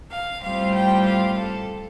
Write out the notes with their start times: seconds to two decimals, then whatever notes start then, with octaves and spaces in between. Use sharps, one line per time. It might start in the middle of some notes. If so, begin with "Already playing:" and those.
0.11 F5
0.42 A2 G3 C4 F4 F5
0.74 G5
1.06 F5
1.38 A4